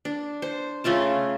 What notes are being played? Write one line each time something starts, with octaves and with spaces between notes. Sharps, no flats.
D4
C5
C#3 A3 F4 A5